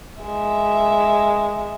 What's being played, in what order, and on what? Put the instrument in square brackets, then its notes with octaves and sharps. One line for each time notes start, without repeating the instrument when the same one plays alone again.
[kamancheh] G#3 E5